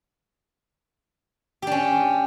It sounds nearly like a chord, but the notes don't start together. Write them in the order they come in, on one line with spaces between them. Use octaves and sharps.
G4 D4 C#4